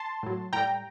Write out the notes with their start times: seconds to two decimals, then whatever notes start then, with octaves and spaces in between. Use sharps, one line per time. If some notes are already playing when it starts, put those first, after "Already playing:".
Already playing: A5 C6
0.23 A2 F#3
0.53 A2 G3 G5 A#5